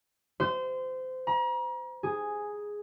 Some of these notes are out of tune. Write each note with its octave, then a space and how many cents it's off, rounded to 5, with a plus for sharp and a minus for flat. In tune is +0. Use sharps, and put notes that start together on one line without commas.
C5 -25
A#5 +40
G#4 +0